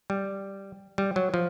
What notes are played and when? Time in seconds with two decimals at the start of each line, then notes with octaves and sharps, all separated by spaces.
0.10 G3
0.98 G3
1.16 F#3
1.34 F3